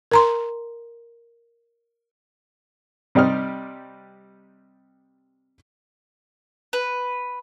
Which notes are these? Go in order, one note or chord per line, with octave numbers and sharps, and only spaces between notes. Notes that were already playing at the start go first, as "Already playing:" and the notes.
A#4 A#5 C6
C3 G3 D#4 G4 D5 F6
B4